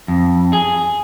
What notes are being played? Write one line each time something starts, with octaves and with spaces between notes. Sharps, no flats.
F2
G#4